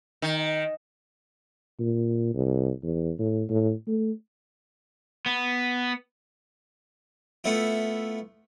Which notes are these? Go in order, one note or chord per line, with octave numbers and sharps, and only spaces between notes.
D#3
A#2
C2
E2
A2
A2
A3
B3
A3 B3 E4 F4